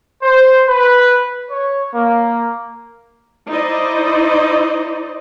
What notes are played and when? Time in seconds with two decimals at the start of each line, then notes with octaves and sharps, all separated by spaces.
0.22 C5
0.67 B4
1.50 C#5
1.94 A#3
3.48 D#4 E4 C5 D5 D#5